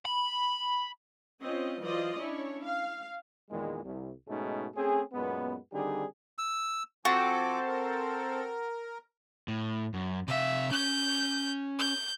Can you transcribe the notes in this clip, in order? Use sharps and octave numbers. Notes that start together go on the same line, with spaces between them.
B5
C4 C#4 F4 D#5
E3 F#3 F4 C5 D5 D#5
C#4 D4 E4 C#5
F5
E2 A#2 D#3 G#3
C2
G#2 B2 G#3 A3 C#4 D#4
A3 C4 C#4 G#4
F#2 A#2 G#3 B3
D3 D#3 G3 C4 D#4 G#4
E6
F3 C4 F#4 A4 G#5 D6
A#4
A2
F#2
C3 E5 F5
C#4 G6
G6